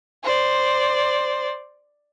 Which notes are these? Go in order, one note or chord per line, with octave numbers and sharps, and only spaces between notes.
C5 D5